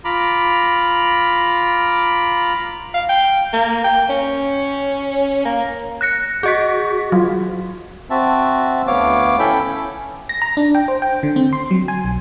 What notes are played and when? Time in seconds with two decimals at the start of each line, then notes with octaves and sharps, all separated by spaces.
0.05 F4 A#5 B5 D6
2.94 F5
3.09 G5
3.53 A#3
3.84 G5
4.10 C#4
5.46 A#3
6.01 F#6 A#6 C#7
6.43 F#4 G#4 D#5 B6
7.12 F#3 F4
8.10 C4 F#4 E5 A5
8.87 D2 B3 C#5 F5 D6
9.39 C#4 E4 A4 E5 G5 B5
10.29 A#6
10.42 A#5
10.57 D4
10.75 G5
10.88 C5
11.02 G5
11.23 D3
11.36 C4
11.53 C6
11.71 F#3
11.88 G#5
12.05 B1